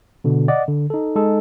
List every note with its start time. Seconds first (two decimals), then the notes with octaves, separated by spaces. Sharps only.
0.24 B2 D3
0.48 D5 D#5 F#5
0.68 D3
0.90 D#4 A4
1.16 G#3 D#4 G#4 A4